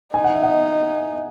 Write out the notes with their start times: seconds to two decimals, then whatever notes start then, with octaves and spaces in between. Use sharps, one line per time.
0.14 D#4 G#5
0.24 F#5
0.34 E5
0.43 D#5 F#5